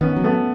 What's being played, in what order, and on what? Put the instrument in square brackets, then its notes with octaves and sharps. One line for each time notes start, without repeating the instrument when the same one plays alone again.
[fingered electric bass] D#3 [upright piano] B3 C#4
[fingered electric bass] F#3
[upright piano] A3 B3